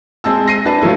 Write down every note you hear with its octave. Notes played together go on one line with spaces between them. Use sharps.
G#3 C4 A5 E6
A#6 C7 D#7
D4 B4 A5
F3 F#3 A3 E4